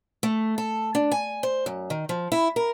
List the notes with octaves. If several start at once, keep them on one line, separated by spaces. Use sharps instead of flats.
A3
A4
D4
G#5
C5
F#2
D#3
F3
E4
A#4